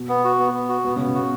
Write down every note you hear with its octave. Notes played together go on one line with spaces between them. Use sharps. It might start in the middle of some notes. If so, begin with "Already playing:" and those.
Already playing: B2
B3
F#4
B3
B3
F#4
B2 B3
C#3
B3
C#3
B2 F#4